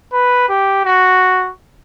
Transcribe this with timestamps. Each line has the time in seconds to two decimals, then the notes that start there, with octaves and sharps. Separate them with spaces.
0.13 B4
0.49 G4
0.85 F#4